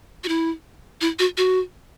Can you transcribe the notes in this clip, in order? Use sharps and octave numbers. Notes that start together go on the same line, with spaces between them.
F#4
E4
E4
F#4
F#4